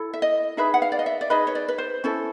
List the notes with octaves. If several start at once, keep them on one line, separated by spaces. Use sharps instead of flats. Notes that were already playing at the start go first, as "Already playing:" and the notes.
Already playing: E4 A4
E5
D#5
D#4 G#4 B4 E5
F#5
F5
D5
D#5
E5
D5
D#4 G#4 B4 D#5
C#5
D5
B4
C5
C#4 E4 A4